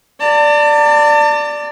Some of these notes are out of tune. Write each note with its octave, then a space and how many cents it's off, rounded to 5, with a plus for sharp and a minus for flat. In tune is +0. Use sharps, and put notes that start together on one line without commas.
D5 +0 A5 +40